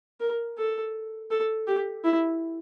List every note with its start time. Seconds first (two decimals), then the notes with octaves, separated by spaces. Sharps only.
0.20 A#4
0.58 A4
1.31 A4
1.67 G4
2.04 E4